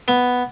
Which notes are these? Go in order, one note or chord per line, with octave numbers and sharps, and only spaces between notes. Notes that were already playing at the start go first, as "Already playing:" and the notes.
B3